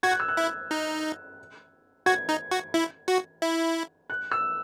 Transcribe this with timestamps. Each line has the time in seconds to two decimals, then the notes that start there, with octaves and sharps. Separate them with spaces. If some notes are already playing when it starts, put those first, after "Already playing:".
0.03 F#4 G#6
0.11 F#6
0.20 E6
0.28 F#6
0.37 E4
0.71 D#4
2.06 F#4 G#6
2.29 D#4
2.51 F#4
2.74 E4
3.08 F#4
3.42 E4
4.10 F#6
4.31 E6